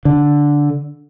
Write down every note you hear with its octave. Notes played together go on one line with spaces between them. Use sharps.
D3